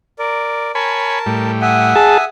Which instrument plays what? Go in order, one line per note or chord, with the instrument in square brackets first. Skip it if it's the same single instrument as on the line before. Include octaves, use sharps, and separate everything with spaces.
[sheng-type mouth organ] A#4 D5
[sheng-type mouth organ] A#4 A5 [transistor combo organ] C#5 G#5 B5
[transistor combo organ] A2 G3
[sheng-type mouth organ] E5 G#5 D#6 [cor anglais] F#5
[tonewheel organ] G#4 A5